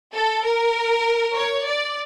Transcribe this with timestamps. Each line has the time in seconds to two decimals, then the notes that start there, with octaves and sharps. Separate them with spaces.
0.13 A4
0.44 A#4
1.35 C#5
1.67 D5